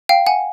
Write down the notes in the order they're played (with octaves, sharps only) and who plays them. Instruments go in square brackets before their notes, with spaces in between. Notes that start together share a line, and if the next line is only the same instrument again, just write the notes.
[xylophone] F5 G5
F#5 G#5